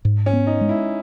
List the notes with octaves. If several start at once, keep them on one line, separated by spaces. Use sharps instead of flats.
G#2
C#4
B3
D#4
G#3
E4